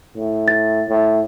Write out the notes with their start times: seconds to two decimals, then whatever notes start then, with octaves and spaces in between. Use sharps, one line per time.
0.16 A2
0.48 A6
0.89 A2